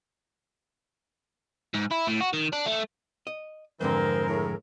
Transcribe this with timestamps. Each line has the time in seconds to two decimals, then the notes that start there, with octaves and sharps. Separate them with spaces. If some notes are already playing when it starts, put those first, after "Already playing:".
1.74 G#2
1.91 E4
2.07 A2
2.21 F#4
2.33 D#3
2.53 D4
2.66 A3
3.27 D#5
3.81 F2 G#2 D3 E3 C4 G#4 A#4 C5
4.27 A2